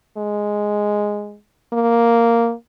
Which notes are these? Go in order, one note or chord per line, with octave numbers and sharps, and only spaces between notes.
G#3
A#3